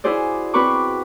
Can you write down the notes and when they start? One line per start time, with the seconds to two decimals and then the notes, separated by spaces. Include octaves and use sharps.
0.04 E4 F#4 G#4 C5 D5
0.54 C4 F#4 B4 B5 C#6 D6